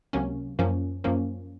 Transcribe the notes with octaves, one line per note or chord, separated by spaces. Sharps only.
C#2 C3 F#3 A#3 C#4
F#2 F3 A#3 C#4
F#2 F3 A#3 C#4